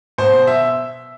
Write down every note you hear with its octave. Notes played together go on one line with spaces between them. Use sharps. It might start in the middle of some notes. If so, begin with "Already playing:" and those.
B2 C5
E5